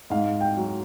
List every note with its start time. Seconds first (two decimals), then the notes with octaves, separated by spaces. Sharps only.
0.10 G#2 F5
0.41 G5
0.56 F#3